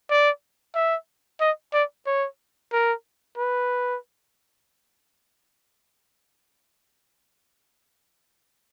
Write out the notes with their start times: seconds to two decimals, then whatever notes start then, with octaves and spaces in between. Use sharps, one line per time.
0.10 D5
0.76 E5
1.41 D#5
1.73 D5
2.07 C#5
2.73 A#4
3.38 B4